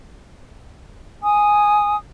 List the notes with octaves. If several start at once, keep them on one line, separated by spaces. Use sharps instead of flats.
G#5 D#6